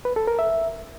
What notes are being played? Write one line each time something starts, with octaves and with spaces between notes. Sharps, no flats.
B4
A4
A#4
E5